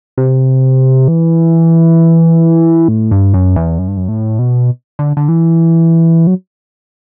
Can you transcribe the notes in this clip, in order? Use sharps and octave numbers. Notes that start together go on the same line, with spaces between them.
C3
E3
A2
G2
F#2
E2
F#2
G2
F#2
A2
B2
D3
D3
E3
F#3